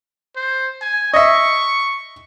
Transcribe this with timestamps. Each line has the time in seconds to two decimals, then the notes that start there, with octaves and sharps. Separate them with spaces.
0.36 C5
0.81 G#5
1.14 D#5 E5 C#6